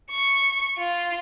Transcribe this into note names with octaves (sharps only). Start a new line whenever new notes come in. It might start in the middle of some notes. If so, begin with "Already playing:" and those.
C#6
F4